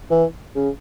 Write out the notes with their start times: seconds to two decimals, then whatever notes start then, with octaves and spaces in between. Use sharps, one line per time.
0.11 E3
0.56 C#3